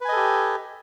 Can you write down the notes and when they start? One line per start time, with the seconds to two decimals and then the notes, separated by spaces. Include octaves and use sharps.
0.01 B4
0.05 G#5
0.09 D#5
0.12 A4
0.16 G4